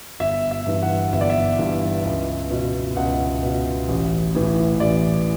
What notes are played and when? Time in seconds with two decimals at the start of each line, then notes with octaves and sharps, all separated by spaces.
0.20 G1 E5
0.51 E5
0.66 G2 E3
0.83 F#5
1.12 G1 E5
1.21 D5
1.30 E5
1.59 G2 E3
2.05 C#2
2.51 B2
2.96 C#2 F#5
3.43 B2
3.88 A1
4.35 A2 E3
4.80 A1 D5